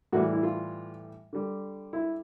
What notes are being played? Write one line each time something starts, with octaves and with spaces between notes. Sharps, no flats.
A2 E3 G3 F#4
E4
F4
D3 G3
E4